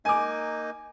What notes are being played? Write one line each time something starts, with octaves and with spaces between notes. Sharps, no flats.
A#3 D#4 D#5 G#5 D6